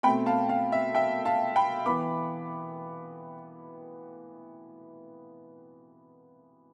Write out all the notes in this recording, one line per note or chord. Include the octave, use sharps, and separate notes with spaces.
B2 A3 C4 G5 B5
F5 A5
F5
E5
E5 G5
F5 A5
G5 B5
E3 B3 B5 D6